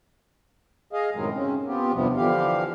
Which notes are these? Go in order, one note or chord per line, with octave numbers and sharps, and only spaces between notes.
G#4 D#5 F5
F#2 A2 C3 D#3 F#3 G#3
C#3 C4 C#4
B3 C4 F4 G4
E2 G2 C3 F3 B3
D3 E3 F3 G4 F5